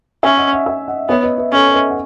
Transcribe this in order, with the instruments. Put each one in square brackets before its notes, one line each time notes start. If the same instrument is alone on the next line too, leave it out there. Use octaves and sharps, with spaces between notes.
[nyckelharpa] C#4 [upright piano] E5 G#5
[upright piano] D#5 F#5
D#5 F#5
E5 G#5
D#5 F#5
[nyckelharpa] B3 [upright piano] C#5 E5
[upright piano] B4 D#5
B4 D#5
[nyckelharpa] C#4 [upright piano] A4 C#5
[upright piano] C#5
B4 D#5
F#5